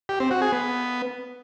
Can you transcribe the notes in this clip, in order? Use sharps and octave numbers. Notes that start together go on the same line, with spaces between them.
G4
C4
F#4
G#4
B3